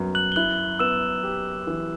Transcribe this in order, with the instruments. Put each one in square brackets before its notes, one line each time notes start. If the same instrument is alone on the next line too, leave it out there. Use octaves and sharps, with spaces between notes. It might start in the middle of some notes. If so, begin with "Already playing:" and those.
Already playing: [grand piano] F#2 F#3 B3
[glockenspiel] F#6 F#7
G7
[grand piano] E4 [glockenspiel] F#6 F#7
[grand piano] B3 [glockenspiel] E6 E7
[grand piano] G4
E3